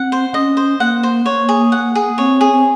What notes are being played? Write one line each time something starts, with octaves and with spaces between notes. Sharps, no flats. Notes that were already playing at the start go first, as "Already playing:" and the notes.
Already playing: C4 F#5
C5
C#4 D#5
C5
A#3 F#5
C5
A#3 C#5
G#4
F#5
G#4
C4 C#5
G#4
C4